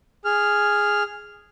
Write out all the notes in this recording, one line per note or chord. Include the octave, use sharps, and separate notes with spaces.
G#4 F6